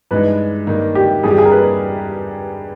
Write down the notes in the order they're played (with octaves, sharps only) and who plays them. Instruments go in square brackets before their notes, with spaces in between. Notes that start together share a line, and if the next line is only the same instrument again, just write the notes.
[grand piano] G2 E3 G#3 D#4 [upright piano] B4
[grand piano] G2 D#3 A#3
[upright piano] G4
[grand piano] G2 E3 G3 [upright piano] G#4
[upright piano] G4
G#4
A#4
B4